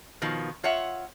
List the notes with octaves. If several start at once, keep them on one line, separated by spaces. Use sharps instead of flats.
B2 D#3 F3
F4 C#5 E5 F#5